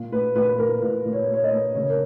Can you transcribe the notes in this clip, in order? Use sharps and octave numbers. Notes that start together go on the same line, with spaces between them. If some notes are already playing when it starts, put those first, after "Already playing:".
Already playing: A#2
A#2 B4
A#2 B4
B4
A#2 A#4
A#2 B4
A#2
C#5
A#3
C#5
D#5
A#3
C#3 C#5
A#4